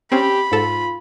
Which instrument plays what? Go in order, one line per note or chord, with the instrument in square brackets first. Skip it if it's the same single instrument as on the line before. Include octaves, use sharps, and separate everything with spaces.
[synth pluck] C4 C#4 [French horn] G4 [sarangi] B5
[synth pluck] G#2 A4 [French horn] F4